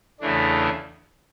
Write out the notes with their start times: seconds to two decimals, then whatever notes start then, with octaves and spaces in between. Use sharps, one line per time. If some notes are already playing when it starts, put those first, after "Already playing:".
0.20 E2 C#3 E3 A3 D4